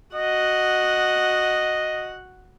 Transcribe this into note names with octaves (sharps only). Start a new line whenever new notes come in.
F#4 D#5 F#5